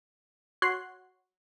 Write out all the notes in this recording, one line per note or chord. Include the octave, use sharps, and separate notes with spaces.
F#4 C#5 C6 F#6 C7